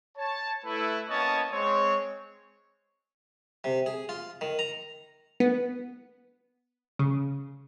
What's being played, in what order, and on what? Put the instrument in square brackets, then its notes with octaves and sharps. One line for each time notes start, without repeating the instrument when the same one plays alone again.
[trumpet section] C#5 A5
A3 E4 B4
A#3 B3 C#4 C#5 D#5 A5
G#3 C4 C#5
[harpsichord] C3
G#4
F4
D#3
A#5
[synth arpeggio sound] B3
C#3